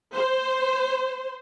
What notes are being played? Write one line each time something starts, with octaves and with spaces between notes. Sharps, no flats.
C5